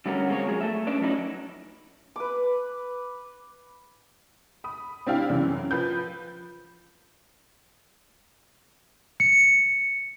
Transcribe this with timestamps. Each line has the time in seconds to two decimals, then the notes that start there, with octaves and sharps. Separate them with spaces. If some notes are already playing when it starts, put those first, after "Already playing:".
0.06 D3 G3 A3 C#4 F#4 A#4
0.28 G#3 A#3 C4 C#5
0.46 F3 F#3 G#4
0.61 A3 E5
0.87 C#4 D4 B4 D5 E5
1.01 F3 F#3 A3 C#4 D#4 E4
2.16 B4 D6
4.64 B5 D#6
5.07 C4 D4 E4 G4 F5 G5
5.30 F#2 C#3 E3
5.71 F3 B4 G6
9.20 C#7